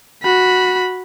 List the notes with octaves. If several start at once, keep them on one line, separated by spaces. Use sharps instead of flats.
F#4 B5